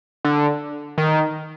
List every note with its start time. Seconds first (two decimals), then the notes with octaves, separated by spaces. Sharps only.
0.25 D3
0.98 D#3